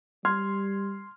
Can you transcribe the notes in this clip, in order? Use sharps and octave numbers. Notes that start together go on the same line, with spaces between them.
G3 C6 F6 G#6